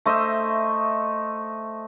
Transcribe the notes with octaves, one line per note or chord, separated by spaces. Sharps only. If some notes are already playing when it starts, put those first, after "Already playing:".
A3 C5 D#5 E5